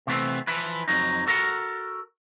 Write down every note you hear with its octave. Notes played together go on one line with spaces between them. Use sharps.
C3 E3 A3 B3 C4
E3 F3 E4 B4
F2 F#3 D#4
F#4 A4 A#4 E5 F#5